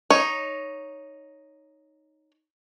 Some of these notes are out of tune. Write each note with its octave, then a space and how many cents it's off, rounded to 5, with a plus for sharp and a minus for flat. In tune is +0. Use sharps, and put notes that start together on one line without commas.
D#4 +0 C#5 +0